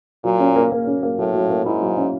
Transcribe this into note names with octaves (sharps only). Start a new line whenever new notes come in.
A#2 F#3
C#4
A#3
A#3
C#4
A#3
A2 F#3
F#3
A#3
G#2 E4
F#3
C#4